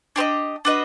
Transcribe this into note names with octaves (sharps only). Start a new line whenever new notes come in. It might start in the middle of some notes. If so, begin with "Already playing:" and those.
D4 G4 C5 D#5
D4 F#4 B4 D#5